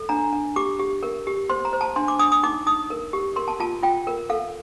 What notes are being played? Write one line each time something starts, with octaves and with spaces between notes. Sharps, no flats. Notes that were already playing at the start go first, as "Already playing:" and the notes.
Already playing: A4
D4 A#5
D4
G4 D6
G4
A#4
G4
C5 C6
A#5
C5
A5
D4 C6
D6
D4 D#6
D#6
D#4 D6
D#4 D#6
A#4
G4
A#4 C6
A5
F4 A5
F4 G5
A#4
A4 F5